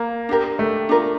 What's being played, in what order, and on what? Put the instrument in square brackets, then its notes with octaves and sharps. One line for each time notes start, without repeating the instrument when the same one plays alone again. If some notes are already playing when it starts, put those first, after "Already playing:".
Already playing: [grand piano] A#3
[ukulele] D4 G4 A#4
[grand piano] A3
[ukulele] D4 F4 A#4